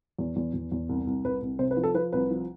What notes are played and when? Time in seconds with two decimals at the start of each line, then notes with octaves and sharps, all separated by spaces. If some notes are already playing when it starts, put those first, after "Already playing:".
0.18 E2
0.36 E2
0.54 E2
0.72 E2
0.89 C2
1.07 C2
1.25 C2 B4
1.42 C2
1.59 C3 C5
1.71 B4
1.77 F3
1.84 A4
1.94 F3 B4
2.13 C2 B4
2.31 F3